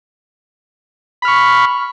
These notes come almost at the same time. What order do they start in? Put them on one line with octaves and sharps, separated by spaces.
B5 F6 C#6